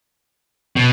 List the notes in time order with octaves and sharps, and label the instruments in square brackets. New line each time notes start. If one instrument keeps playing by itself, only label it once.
[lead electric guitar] B2